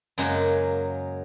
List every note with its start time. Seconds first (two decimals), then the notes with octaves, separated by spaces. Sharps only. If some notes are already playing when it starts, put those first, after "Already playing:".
0.18 F#2 C#3 F#3 G#3 A#3